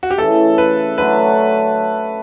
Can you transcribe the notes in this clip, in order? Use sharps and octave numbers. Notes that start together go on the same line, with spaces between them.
F#4
G4
C#3 E3 A3 A4
B4
D3 F#3 A3 B4